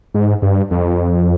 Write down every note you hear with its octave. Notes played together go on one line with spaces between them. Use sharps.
G#2
G2
F2